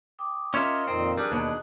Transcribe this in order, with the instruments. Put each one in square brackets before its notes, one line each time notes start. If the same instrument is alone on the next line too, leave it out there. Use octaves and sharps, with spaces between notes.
[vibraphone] G5 D6 D#6
[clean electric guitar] C#4 C#5 E5 [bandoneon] F4 A#4 D#5
[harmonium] F2 A#2 D#3 [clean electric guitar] C4 [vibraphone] A#4 A#5 [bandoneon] D#5
[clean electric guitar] G3 [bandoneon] D4 G#4 F#6 [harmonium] B4
[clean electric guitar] D#2 B2 [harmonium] D#4